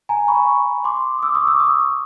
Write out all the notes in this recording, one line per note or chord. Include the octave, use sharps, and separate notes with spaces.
G#5 A#5
B5 C#6
C6 D6
D#6
D6 E6
C#6 D#6
D6 E6
C#6 D#6